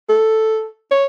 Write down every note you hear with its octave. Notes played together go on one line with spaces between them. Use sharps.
A4
C#5